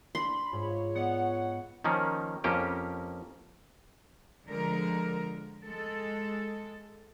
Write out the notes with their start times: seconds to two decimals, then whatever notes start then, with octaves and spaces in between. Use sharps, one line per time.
0.15 D4 B5 C6
0.52 G#2 F4 C#5
0.95 B3 D5 D#5 F#5
1.84 D#3 F3 A#3 C#4
2.44 F2 A#3 C#4 G4 G5
4.45 D3 F3 G#3 A#4
5.64 G#3 A4